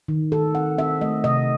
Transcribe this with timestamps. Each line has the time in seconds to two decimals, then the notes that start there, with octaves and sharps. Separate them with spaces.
0.08 D#3
0.32 D#3 A4
0.55 C4 F#5
0.78 C4 E5
1.01 A3 D#5
1.24 C3 D#5